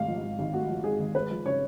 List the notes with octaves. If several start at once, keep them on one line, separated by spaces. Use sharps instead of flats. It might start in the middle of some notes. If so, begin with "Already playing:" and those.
Already playing: G#1 G#2 A3 F5
F3
G#2
G#1
A3 F#4
F3
G#2 G#4
G#1
G#3 B4
F3
C#3 C#5